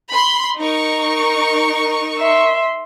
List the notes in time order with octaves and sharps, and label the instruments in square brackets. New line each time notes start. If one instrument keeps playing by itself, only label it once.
[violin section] B5 C6
D#4 A#4 C#6
[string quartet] E5 C6